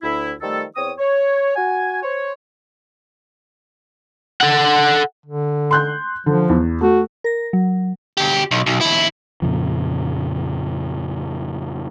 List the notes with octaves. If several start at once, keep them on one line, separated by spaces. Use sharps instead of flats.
D2 E4
D#3 F3 G3 A3 A4
E2 C4 C#5 D#6
C#5
F#4 G#5
C5 C#5
A4 F#5
D3
C6 F#6 G6
D3 F3
E2
A3 F#4
A#4 A#6
F#3
D2 G4
B1
B1
D#2 E4
F2 A#2 C#3 F3